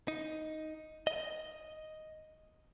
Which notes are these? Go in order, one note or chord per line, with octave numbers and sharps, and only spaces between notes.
D#4
D#5